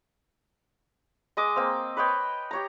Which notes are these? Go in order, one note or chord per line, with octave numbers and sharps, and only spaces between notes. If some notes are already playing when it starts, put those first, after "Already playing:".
G#3 D#5 D6
A#3 C4
B4 C#5 D#5 G5
G4 C#5 A#5